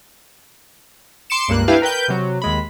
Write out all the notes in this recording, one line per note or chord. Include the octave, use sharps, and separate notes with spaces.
C6 D6 C#7 E7
C#2 G2 A#3 F#6
D4 E4 G4 B4 F5 G5
A#4 B4 G5 G6
C3 F#3
D#2 G#3 B5